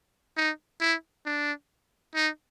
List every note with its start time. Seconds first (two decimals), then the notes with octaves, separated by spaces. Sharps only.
0.37 D#4
0.81 E4
1.26 D4
2.15 D#4